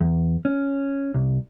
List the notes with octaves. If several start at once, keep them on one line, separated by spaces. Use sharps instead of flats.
E2
C#4
C2